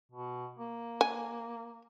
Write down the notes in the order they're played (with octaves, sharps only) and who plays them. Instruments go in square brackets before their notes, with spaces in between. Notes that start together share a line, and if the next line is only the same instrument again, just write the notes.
[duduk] B2
A#3
[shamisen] G#5